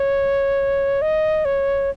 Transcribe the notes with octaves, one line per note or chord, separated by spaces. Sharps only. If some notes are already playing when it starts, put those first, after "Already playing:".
Already playing: C#5
D#5
C#5